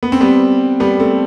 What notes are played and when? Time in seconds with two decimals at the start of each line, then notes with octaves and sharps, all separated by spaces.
0.03 B3
0.12 C4
0.21 G3 B3
0.80 G3 B3
1.00 A3 C4